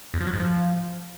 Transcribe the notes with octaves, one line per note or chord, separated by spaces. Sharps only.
E2
F3
F#3
G#2
F3